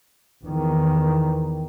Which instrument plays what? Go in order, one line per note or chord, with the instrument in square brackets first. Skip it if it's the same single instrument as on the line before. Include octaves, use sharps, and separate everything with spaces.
[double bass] E2 D#3